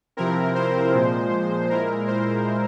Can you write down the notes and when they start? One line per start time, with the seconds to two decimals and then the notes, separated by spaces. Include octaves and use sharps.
0.17 C3 F3 C4 E4 A#4
0.55 C5
0.93 A#2 F3 G#3
1.70 A#2 G#3 E4 A#4
2.08 C5